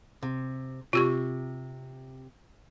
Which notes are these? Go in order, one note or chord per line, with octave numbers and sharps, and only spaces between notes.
C3
C3 F4 G4 C#6